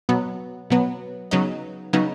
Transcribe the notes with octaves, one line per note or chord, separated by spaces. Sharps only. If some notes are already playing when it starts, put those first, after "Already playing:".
B2 F#3 B3
B2 F#3 B3
C#3 F#3 B3 D#4
C#3 F#3 B3 D#4